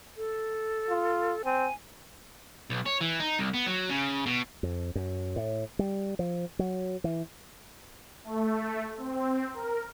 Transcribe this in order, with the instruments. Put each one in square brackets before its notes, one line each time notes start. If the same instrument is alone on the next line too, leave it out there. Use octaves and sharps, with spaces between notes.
[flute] A4
[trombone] F4
[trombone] C4 [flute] G#5
[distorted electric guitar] B1
C#5
E3
D#4
C2
B3
F#3
C#3
B2
[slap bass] F2
F#2
A2
G3
F3
F#3
E3
[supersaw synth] A3
C4
A#4